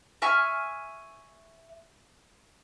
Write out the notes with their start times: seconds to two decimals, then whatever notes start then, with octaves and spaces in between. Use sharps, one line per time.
0.22 E5 G#5 C#6 F6